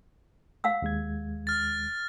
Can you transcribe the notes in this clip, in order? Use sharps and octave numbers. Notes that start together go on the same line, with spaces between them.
F5 F#5 E6
D#2 G#3 G#6
F6 A6